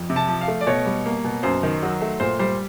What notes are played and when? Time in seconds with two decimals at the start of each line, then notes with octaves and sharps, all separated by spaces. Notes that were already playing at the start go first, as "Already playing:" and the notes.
Already playing: F2
0.10 C3
0.16 A5
0.28 F3
0.41 F5
0.48 A3
0.61 D5
0.67 B2 C#5
0.85 G3
1.06 A#3
1.24 B2
1.43 F#2 C5
1.63 D#3
1.82 F#3
2.01 A3
2.20 A#2 C5
2.39 G3 C5